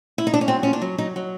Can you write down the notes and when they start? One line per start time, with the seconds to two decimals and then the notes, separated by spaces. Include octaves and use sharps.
0.18 E4
0.27 D#4
0.34 D4
0.41 C#4
0.48 F#3 C4
0.63 A#2 C#4
0.73 D4
0.82 F#3
0.98 F#3 D#4
1.16 F#3